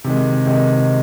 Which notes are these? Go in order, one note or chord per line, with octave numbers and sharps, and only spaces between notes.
C3 D#3 G#3
C3 D#3 G#3